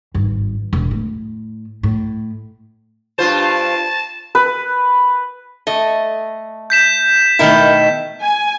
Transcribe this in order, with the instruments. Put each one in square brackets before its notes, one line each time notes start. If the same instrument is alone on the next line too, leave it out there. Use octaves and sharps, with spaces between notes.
[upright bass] G#1 G2
E1
A2
A2
[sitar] G2 F4 C5 [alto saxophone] A5
[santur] B4
[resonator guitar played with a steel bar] A3 [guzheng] D#5
[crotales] G6 B6 E7
[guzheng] B2 D#3 A3 [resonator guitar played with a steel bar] E4 A#4
[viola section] G#5